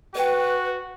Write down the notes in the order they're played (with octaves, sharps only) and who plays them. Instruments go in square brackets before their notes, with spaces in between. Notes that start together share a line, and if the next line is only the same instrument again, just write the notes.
[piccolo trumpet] F#4 [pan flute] B4 [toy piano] D5 G5